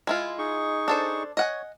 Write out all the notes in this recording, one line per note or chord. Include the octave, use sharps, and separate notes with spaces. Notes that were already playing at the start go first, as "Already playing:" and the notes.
G#3 E4 F4
D#4 G#4 C#6
D4 A4 C5
C#5 D#5 F#5 G#5